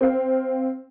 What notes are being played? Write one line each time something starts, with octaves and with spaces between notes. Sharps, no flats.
C4 F5